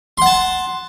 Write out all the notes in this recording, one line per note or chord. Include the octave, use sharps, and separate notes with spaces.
F#5 A5 C6